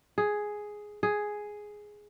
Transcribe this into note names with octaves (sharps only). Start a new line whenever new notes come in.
G#4
G#4